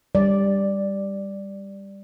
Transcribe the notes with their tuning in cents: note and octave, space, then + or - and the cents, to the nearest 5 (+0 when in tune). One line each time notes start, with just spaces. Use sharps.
G3 +15 D5 +0